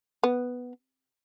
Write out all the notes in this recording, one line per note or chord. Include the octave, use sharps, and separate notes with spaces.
B3